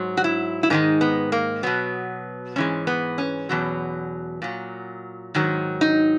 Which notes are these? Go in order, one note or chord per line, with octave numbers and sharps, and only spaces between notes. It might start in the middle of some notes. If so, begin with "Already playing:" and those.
Already playing: G#2 F#3
F#4
E4
E4
G#2 D#3 G#3 D#4
B3
A#3
B2 F#3 B3
G#2 E3 G#3 C#4
B3
C#4
E2 B2 F#3
A#2 F#3
G#2 D#3 F#3
D#4